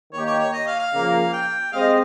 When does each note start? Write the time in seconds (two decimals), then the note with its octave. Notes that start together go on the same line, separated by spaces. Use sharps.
0.13 D#3 A#3 D#4 G4 C#5
0.26 C#5
0.39 C#5
0.53 D#5
0.67 F5
0.79 F5
0.93 C#3 F3 A#3
1.33 G5
1.72 G#3 C4 G4 C5 D#5 F5